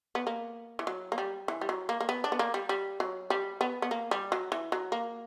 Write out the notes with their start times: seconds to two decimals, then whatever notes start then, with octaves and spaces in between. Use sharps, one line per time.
0.15 B3
0.27 A#3
0.79 E3
0.87 F#3
1.12 A#3
1.18 G3
1.48 E3
1.61 G3
1.69 F#3
1.89 A#3
2.01 A#3
2.09 B3
2.24 D4
2.32 B3
2.39 A#3
2.54 G3
2.69 G3
3.00 F#3
3.30 G3
3.61 B3
3.82 B3
3.91 A#3
4.11 G3
4.32 F#3
4.52 E3
4.72 F#3
4.92 A#3